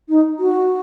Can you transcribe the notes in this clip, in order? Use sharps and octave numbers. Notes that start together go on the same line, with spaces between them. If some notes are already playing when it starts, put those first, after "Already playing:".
D#4
F#4